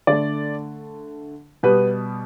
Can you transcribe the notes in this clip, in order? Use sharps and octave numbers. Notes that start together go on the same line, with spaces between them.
D3 A3 D5
B2 G3 B3 B4